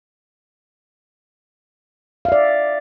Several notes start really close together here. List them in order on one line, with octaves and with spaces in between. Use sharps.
F5 E5 D5